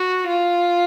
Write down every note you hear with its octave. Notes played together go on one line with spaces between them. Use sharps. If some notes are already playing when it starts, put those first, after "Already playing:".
Already playing: F#4
F4